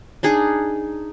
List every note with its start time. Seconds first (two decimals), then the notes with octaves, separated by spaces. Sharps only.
0.23 D4 D#4 G#4